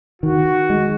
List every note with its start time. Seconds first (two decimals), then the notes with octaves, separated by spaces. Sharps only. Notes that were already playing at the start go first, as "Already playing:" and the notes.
0.22 D#3 F#4
0.70 G#3